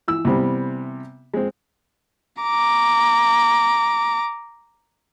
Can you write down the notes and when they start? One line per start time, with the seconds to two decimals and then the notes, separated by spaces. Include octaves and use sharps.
0.08 E3 E6
0.25 C3 E3 G3 B3 C4
1.34 G#3 C4
2.42 A#5 D6